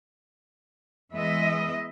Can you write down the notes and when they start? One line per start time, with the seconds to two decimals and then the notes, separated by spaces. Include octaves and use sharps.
1.12 E3 G#3 B3 D#5 E5